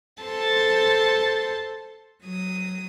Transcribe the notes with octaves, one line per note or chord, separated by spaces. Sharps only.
A4 C5 A5 C6
F#3 D#6